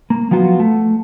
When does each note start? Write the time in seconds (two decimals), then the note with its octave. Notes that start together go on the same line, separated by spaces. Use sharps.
0.10 A#3
0.31 F3 F#3 B3 F4 F#4
0.60 A3